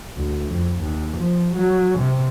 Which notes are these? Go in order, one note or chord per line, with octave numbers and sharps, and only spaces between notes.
D2
F2
D#2
F3
F#3
C3